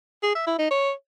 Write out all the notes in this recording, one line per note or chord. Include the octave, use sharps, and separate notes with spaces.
G#4
E5
E4
D#4
C#5